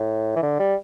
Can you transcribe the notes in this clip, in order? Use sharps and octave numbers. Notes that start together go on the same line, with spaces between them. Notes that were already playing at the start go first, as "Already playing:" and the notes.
Already playing: A2
E3
D3
G3